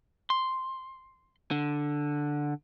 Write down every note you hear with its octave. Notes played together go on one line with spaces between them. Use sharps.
C6
D3